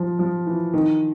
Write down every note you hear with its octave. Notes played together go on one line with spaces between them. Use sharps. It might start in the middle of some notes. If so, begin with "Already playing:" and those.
Already playing: F3
F3
E3
D#3